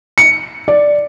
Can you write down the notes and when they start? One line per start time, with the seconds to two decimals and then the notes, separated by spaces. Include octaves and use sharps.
0.18 C#7
0.68 D5